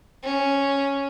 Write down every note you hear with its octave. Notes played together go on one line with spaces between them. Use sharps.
C#4